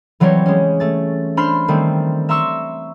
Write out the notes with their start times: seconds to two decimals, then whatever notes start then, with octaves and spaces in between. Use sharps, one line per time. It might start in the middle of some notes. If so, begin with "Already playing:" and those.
0.20 E3 F#3 G3 C4 G4 C#5
0.46 G#3 C#4
0.80 A3 A6
1.37 D4 C5 B5 C6 F6 C7
1.68 D#3 G3 A3 C4
2.29 E5 A#5 C6 C#6 E6